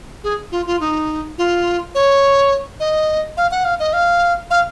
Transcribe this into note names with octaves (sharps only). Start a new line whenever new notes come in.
G#4
F4
F4
D#4
F4
C#5
D#5
F5
F#5
F5
D#5
F5
F5